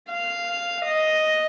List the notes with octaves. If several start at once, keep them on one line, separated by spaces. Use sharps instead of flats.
F5
D#5